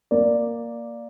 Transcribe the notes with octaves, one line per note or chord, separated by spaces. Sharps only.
A#3 D5